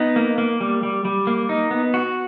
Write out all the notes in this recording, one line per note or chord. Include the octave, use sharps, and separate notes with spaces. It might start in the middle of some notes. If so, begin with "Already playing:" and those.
Already playing: B3 D#4
A#3
A#3
G3
G3
G3
A#3
D#4
B3
F#4